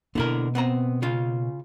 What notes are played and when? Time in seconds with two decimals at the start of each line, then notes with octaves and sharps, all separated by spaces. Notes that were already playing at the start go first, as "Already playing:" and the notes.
0.15 B2 D3 A#3 E4 A#4
0.55 B3 C4 A#5
1.02 C#3 C#4 F4